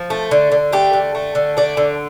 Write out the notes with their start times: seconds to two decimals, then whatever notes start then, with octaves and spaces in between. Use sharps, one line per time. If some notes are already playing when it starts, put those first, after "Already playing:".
Already playing: F3
0.10 A3
0.31 D3
0.52 D3
0.73 A3 G4
0.93 D3
1.15 A3
1.35 D3
1.57 A3 D5
1.77 D3